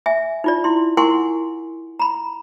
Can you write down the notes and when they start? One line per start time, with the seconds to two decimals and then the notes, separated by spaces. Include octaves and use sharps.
0.06 E5 G#5
0.44 D#4 F4 D5
0.64 E4 C6
0.97 E4 A#4 F#5 G#5 C6 C#6
2.00 A#5 B5